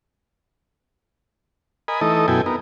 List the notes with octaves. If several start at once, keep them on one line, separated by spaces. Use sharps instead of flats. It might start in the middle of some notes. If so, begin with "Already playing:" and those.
A#4 D#5 G#5 B5
E3 A3 D#4 A4 D#5
F#2 B2 E4 A4 G5 G#5
B3 D#4 A#4